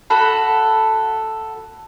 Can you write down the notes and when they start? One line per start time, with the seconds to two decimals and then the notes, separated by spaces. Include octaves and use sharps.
0.10 F#4 A4 B5